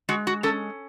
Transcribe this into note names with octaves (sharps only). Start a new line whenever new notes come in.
G#3 F#4
F#4
C#4 A4